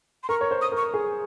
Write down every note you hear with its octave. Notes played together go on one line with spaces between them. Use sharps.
C6
A#4 C#6
C#5
C5
D#6
A#4
C#6
G#4